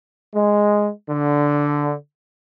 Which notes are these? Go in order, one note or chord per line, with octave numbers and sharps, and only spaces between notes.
G#3
D3